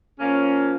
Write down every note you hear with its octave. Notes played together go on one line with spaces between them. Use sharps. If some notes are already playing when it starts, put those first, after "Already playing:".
A#2 F3 A#3 C#4